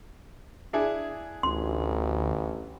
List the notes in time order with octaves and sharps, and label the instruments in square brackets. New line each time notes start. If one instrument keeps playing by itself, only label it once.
[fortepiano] D4 E4 G#4
[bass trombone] A1 [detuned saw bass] D2 [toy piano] C6